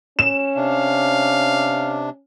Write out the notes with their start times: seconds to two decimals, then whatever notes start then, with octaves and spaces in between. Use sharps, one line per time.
0.19 C#4 E7
0.56 C3 D4 F5